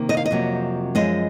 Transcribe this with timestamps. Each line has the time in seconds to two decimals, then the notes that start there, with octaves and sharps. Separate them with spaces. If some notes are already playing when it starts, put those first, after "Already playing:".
Already playing: C3 D#3 A#3
0.09 D#5
0.17 F5
0.26 D#5
0.31 F2 C3 F#3 A#3
0.95 F#2 F3 G#3 D#5